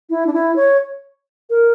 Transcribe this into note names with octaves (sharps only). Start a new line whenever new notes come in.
E4
D4
E4
C#5
A#4